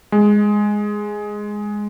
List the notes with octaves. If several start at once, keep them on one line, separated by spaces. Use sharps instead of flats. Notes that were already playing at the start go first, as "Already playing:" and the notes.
G#3